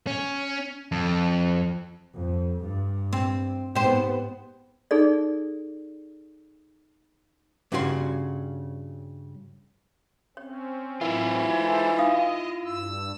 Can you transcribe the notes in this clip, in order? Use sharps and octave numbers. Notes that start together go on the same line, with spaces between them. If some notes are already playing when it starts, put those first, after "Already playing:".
C#4
F2
F2
G2
C4
G#2 B3 G4 C5
D#4 G#4 A4 D5
G2 C#3 C#4 F#4 A#4 C6
C4 C#4 C#5
A2 E3 F#3 C4 E4 F4 A#4
G#3 A4 C5 D5
D#4 D#5 F5 D#6
G2 E6